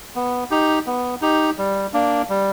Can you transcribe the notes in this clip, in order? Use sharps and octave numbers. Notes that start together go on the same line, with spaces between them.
B3
D#4 G4
B3
D#4 G4
G3
A#3 D4
G3